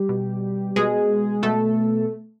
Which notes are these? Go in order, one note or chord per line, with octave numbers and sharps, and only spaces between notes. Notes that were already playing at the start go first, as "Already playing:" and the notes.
Already playing: G3 G4
B2
B2 G#3 G#4
B2 A3 A4